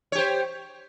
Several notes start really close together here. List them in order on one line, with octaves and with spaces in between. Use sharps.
C#5 G4 C5